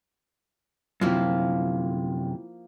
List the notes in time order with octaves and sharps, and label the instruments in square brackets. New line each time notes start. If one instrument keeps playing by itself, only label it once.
[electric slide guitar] F#2 C3 [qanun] F3 A#3 E4